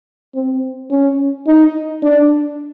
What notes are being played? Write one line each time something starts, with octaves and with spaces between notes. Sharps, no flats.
C4
C#4
D#4
D4